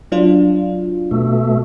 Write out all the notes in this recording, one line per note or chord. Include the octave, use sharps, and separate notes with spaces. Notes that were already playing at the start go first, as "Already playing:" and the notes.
F#3 D4 F4
B2 A3